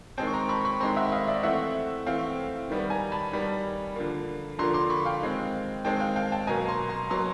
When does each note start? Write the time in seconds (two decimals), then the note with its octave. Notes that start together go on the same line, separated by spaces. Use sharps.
0.18 D#3 G#3 C4 G5 A5
0.27 C#6
0.34 A#5 C6
0.49 B5 C#6
0.65 B5 C#6
0.80 D#3 G#3 C4 A#5 C6
0.97 E5 F#5
1.12 D#5 F5
1.28 D5 E5
1.43 E3 A3 C4 E5 F#5
2.06 E3 A3 C4 F5 G5
2.69 D#3 G3 B3
2.90 G#5 A#5
3.12 A5 B5
3.32 D#3 G3 B3
3.96 D3 F3 A#3
4.59 D3 F3 A#3 A#5 C6
4.74 C6 D6
4.90 B5 C#6
5.05 F5 G5
5.21 D#3 G#3 C4
5.85 D#3 G#3 C4 G5 A5
6.00 F5 G5
6.16 F5 G5
6.32 G5 A5
6.47 B2 F#3 A#3 G#5 A#5
6.68 A#5 C6
6.89 A#5 C6
7.10 B2 F#3 A#3 A#5 C6